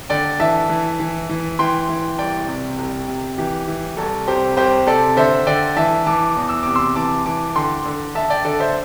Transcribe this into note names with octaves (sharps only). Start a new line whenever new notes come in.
D3 D5 G5
E3 E5 A5
E3
E3
E3
E3 G5 C6
E3
C2 D5 G5
C3
C2
C3
E3 G4
E3
C2 A4
C3 G4 C5
C2 G4 C5
C3 A4 D5
D3 C5 E5
D3 D5 G5
E3 E5 A5
E3 A5 D6
E2
E6
C3 D6
C6 E6
E3 A5 D6
E3 A5 D6
D3 G5 C6
D3
D3 E5 A5
D5 G5
D3 A4 D5
C5 E5